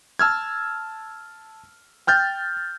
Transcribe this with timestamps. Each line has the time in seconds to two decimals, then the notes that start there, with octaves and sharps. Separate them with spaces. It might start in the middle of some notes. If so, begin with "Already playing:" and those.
0.19 A5 E6 F6 G#6
2.07 G5 F6 G6 A6